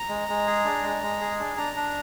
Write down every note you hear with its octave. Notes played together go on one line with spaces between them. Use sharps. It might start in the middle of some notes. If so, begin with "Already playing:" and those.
Already playing: A#5
G#3
G#3
G#4
D4
G#3
G#3
G#4
D4
D4 A#5
D4